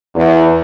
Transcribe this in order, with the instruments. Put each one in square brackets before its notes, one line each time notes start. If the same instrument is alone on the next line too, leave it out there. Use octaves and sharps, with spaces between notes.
[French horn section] E2